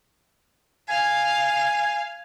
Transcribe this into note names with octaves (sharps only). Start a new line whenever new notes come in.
F5 G#5